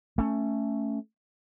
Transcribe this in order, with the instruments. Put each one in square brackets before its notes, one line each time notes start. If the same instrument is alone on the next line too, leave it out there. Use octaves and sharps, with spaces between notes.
[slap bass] A3 C#4